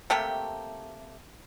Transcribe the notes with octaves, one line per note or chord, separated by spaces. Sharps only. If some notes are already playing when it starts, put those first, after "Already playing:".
C3 A3 A#3 G4